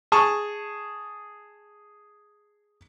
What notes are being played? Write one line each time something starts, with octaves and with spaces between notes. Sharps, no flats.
G#4 A5 C#6